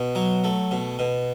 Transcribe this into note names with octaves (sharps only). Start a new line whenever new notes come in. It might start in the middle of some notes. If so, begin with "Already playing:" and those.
Already playing: B2
F#3
A3
B2
B2